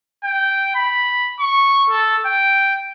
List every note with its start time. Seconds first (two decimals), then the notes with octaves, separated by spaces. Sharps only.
0.24 G5
0.75 B5
1.40 C#6
1.90 A4
2.26 G5